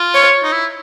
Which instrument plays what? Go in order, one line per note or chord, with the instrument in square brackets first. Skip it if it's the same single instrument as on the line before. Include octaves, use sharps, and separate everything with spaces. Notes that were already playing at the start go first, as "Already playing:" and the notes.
Already playing: [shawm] F4
[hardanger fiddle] C#5
[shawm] D#4
E4